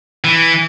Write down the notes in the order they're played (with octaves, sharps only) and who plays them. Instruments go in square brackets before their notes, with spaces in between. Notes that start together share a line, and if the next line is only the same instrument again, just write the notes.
[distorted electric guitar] E3